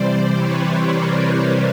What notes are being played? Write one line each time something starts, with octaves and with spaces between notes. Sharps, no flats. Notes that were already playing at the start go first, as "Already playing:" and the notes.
Already playing: C3 E3 G3 C5 D5
B4 C#5
A#4 C5